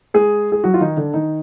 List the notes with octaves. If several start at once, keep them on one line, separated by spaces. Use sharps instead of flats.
G#3 G#4
G#4
F#3 F#4
F4
D#3 D#4
D3 D4
D#3 D#4